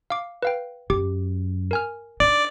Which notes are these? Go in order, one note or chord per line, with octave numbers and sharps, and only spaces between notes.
F5 D6
B4 F5 G5
F#2 G4 D6
A#4 G#5 F6
D4 D#4 D5